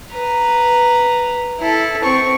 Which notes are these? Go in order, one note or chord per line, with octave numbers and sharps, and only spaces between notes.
B4 A#5
E4 A4
C4 C#6